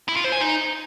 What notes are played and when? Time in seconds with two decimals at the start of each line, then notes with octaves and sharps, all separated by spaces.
0.09 E4
0.16 F4
0.24 C5
0.32 G#5
0.40 D#4